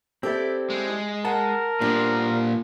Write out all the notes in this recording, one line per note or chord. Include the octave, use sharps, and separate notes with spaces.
C4 E4 G4 A4 D5
G#3
A#4 F#5 A5
A#2 F3 G3 B3 D4